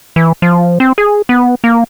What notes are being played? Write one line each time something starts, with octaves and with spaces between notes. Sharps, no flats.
E3
F3
C4
G#4
B3
A#3